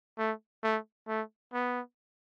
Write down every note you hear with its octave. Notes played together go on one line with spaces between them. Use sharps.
A3
A3
A3
B3